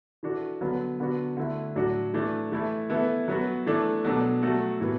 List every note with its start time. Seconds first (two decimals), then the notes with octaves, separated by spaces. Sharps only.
0.23 E3 D4 F#4 A4
0.61 D3 F#3 B3
1.00 D3 B3 D4 F#4
1.37 D3 A3 E4 A4
1.76 A2 F#3 D4 F#4
2.14 E3 A3 D4
2.52 E3 A3 E4
2.90 E3 B3 E4 A4
3.28 F#3 B3 F#4
3.66 E3 A3 D4 A4
4.04 B2 F#3 D4 A4
4.42 F#3 A3 F#4 A4
4.80 A2 E3 B3 F#4